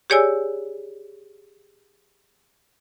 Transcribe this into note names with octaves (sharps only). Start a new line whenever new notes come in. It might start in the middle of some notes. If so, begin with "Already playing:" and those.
G4 G#4 C#5 D5 G#5 E6